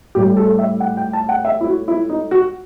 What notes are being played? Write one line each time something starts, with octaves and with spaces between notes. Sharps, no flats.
A2 G3 G4
A4
E5
F#5
G5
A5
F#5
E5
E4
F#4
E4
D#4
F#4